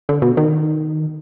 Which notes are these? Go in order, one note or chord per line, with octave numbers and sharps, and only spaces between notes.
D3
B2
D#3